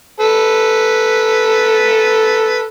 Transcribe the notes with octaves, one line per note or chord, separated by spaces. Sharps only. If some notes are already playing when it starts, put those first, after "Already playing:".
A4 B4